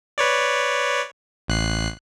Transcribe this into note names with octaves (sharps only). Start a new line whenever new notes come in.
B4 C#5 D5
A1 F#6 C7